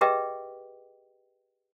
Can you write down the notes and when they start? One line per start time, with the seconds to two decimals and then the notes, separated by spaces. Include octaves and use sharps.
0.01 G4 G#4 B4 D#5 E5 G5